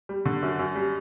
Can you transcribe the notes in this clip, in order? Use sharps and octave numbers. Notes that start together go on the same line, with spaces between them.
G3
D3
F#2
F#2
G3